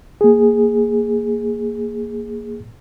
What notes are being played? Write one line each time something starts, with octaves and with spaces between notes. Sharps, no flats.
A#3 G#4